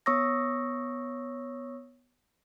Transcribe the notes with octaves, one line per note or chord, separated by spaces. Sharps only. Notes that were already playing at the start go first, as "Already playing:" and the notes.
B3 C#5 C#6 D#6 E6 A#6